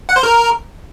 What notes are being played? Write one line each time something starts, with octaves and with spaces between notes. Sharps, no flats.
F#5
C5
A#4